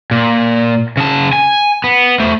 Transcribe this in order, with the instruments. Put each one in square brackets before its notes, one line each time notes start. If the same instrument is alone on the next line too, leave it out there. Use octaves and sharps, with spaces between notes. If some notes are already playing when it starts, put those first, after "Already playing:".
[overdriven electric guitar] A#2
C#3 A5
G#5
B3
A3 C5